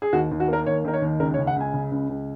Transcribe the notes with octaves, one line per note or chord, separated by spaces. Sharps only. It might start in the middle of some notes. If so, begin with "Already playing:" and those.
G#4
D#2 F#4
D#2
F#4
A#3 A#4
D#2 C#5
D#3 A#4
C#5
D#2
C#2 A#4
C#5
C#3
F#5
C#2 G#5
C#3
C#2
C#2